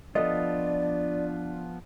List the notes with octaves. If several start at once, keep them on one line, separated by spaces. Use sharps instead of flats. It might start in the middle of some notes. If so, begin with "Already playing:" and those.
F3 B3 D4 F4 A4 D5 D#5